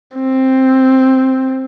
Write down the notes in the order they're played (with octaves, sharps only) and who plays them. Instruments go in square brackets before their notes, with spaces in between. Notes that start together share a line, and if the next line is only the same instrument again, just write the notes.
[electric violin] C4